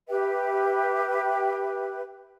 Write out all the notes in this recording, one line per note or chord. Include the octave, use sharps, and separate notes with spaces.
G4 B4 E5 G5